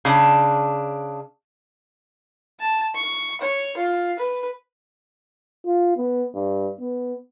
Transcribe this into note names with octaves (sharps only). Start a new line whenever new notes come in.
C#3 D4
A5
C#6
C#5
F4
B4
F4
B3
G2
B3